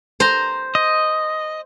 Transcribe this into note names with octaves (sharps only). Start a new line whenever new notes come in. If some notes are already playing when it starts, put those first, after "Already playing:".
C5 A#5
D#5